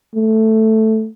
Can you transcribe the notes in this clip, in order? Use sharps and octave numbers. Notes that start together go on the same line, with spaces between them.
A3